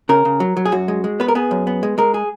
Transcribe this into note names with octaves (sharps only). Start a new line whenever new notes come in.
C#3 A#4
C#3
F#3
F#3
G#4
F#2 F#4
G#3
G#3
B3 B4
A#4
B3 G#4
F#2
B3
G#3
G#3 A#4
G#4